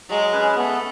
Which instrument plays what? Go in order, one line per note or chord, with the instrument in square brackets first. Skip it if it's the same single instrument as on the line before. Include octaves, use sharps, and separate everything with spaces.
[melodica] F#3 [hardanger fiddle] G#3
[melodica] C#4 G#4 B4
[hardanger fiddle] A3 [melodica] B3